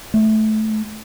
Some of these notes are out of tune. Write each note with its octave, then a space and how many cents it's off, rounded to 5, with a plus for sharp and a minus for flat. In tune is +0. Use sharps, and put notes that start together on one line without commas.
A3 -15